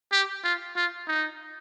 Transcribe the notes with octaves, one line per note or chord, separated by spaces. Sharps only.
G4
F4
F4
D#4